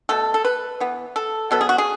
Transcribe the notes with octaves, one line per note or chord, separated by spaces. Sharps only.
B2 A3 A4
A4
B4
E3 B3
A4
B2 F#3 B3 A4
G#4
F#4
G#4